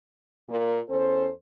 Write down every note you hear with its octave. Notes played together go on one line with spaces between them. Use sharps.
A#2
E2 C#4 A4 C5